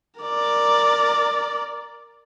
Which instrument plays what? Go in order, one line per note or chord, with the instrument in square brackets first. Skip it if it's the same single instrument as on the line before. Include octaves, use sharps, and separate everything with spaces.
[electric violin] A#4 D5